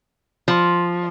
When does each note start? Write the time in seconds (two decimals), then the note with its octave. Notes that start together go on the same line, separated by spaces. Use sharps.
0.48 F3